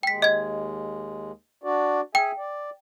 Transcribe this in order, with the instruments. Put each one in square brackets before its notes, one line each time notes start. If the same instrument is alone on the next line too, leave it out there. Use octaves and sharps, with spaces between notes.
[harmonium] D#2 G#3 [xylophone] G5 B6
[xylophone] D#5 G#6
[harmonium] D4 F#4 D5
[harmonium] G#4 E5 G#5 [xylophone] G5
[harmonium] D5